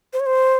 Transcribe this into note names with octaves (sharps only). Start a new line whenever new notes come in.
C5
C#5
C5